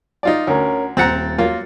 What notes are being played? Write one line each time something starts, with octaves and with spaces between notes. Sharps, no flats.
D#4 F4 D5
D2 C#4 A#4
D#1 C4 F#5 A#5 A6 C#7
F#3 A#3 F4